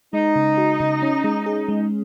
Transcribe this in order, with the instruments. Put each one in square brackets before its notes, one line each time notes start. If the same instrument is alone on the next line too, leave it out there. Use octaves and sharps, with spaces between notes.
[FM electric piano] G#3 [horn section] D#4
[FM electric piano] C#3
F#4
C#3
C#4
G#3
G#4
G#3